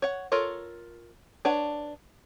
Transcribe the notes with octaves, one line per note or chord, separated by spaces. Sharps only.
C#5 F#5
F4 A4 A#4 C#5
D4 B4 C#5 F#5 A5